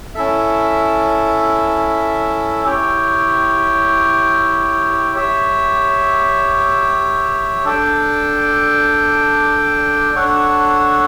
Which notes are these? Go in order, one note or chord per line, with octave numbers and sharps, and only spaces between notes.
C#4 E4 A4 E5
E4 G4 C#5 G5
G4 C#5 E5
D4 A4 D5 G5
D4 A4 C#5 F#5